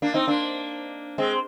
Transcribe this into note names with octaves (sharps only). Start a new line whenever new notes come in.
A#3 D4
C4 D#4
A#3 D4
G#3 C4